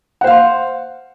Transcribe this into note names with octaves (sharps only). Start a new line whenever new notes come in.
C5 F5 F#5 C6